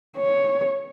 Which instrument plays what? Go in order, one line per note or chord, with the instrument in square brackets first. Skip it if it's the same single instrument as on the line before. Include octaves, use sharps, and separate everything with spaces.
[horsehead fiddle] C#5